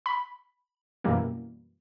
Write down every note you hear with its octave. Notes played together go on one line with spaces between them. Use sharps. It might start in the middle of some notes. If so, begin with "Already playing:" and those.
B5
F#2 B2 E3 G3 A#3